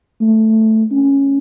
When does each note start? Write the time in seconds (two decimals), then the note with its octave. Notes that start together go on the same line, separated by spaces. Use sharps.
0.21 A3
0.92 C#4